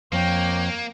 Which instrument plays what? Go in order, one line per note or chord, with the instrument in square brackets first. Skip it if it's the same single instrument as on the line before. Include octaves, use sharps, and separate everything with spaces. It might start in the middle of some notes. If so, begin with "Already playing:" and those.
[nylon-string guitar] F2 [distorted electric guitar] A#3 [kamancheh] C#5 G5